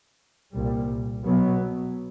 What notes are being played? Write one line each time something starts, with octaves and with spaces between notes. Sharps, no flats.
C2 A#2 G3
B2 F#3 B3